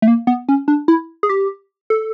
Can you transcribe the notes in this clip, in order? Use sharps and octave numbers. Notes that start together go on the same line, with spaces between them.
A3
A#3
B3
C#4
D4
E4
G#4
G4
A4